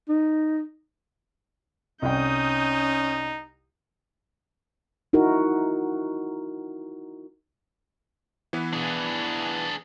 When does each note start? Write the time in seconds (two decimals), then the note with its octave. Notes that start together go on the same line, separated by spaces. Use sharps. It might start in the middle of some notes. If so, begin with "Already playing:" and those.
0.09 D#4
2.02 C2 C#4 D#4 D#5 G5 D#6 G6
5.13 D#4 E4 F#4 A#4
8.53 E3 B3 B4
8.73 D4 G#4